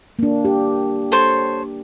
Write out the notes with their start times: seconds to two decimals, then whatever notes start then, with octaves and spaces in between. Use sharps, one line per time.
0.19 A#3 D4
0.45 G4
1.12 A4 C5 C#5